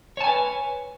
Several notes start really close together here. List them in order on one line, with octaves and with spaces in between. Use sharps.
C#5 A5 G#5 B4